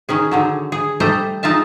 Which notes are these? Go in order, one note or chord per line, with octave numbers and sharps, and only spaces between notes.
D#3 C#4 G#4
D3 D#3 F#3
G#4
G3 A3 A4 C5 D#5 A#5
G#3 D#4 F4 E5 A5